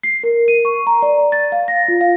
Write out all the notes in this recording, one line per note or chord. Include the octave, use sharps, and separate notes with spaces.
C7
A#4
D#7
C#6
A#5
D5
A6
F5
A#6
F4
F5